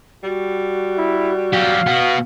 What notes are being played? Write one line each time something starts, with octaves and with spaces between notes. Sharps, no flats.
G3 F#4
E4
F#3 G4 F5
B2 B3